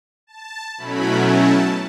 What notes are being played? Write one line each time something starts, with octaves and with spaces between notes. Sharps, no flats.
A5
B2 F#3 A3 C#4 E4 B5
A5